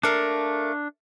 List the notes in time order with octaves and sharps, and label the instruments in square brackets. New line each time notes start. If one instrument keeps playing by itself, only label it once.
[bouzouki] A3 A#3 [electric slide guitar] D4